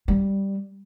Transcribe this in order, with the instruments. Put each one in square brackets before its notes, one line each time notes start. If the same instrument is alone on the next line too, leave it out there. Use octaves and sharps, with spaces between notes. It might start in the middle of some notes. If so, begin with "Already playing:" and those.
[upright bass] G3